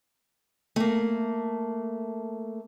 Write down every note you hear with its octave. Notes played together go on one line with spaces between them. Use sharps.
A3 A#3